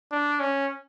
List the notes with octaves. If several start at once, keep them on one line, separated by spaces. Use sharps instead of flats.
D4
C#4